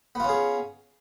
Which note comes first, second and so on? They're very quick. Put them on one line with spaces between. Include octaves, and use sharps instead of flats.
B3 F4 C#4 G#4